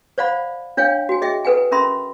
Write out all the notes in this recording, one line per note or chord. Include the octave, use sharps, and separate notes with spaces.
C5 D5 F5 F#5 B5
D4 C#5 F5 G5
F#4 G#5
G#4 D#5 E5 G5
A4 B4 F#5 G#5
C#4 A#4 E5 B5 C6